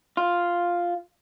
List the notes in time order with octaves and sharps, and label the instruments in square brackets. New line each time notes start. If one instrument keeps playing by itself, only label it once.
[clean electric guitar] F4